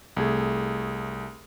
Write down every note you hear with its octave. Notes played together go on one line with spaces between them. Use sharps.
C2 A3 G#4